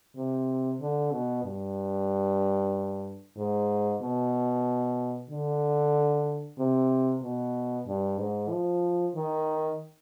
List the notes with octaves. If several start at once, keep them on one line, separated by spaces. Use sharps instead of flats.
C3
D3
B2
G2
G#2
B2
D3
C3
B2
G2
G#2
F3
D#3